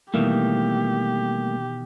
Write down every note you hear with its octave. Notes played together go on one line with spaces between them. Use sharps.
B2 D#3 E3 G3 A3 A#3 G4